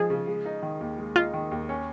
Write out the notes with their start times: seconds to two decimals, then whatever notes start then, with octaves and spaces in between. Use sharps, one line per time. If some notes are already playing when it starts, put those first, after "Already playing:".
Already playing: F3 G#3 D#4 G#4
0.10 C#3
0.27 G#3
0.45 D#4
0.63 D#3
0.81 D#2
0.98 G#3
1.16 D#4 F4
1.34 D#3
1.51 D#2
1.69 C#4